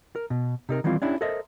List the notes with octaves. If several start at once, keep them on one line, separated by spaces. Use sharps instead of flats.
A#4
B2
C3 D#4 A#4
D#3 E3 G3 C4 F4
C#4 D4 E4 G4
A4 A#4 C5 D#5 E5